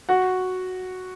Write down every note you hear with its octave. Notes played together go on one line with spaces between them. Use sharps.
F#4 F#5